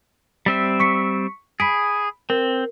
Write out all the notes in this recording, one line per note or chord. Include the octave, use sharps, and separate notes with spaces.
G3 C4 E5
C#6 B6 C#7
G#4 B5 B6 D7
C4 A#4